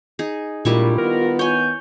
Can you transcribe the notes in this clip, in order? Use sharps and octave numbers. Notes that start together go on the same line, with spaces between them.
D#4 G#4
A#2 G3 G#3 D4 E4 F4 A#4 C#6
D#3 B3 A#4
C#5 G#5 G6